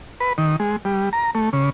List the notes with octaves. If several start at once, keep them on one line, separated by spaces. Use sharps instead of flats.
B4
D#3
G#3
G3
A#5
A3
C#3